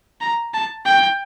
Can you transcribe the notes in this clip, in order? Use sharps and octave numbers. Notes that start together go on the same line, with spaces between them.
A#5
A5
G5